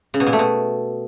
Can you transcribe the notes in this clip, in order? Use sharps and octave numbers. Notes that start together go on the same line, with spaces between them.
C#3
B2
A#2
A3
B2